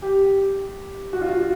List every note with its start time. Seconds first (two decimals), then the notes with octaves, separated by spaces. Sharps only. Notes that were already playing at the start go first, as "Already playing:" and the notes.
0.02 G4
1.13 F#4
1.21 F4
1.29 F#4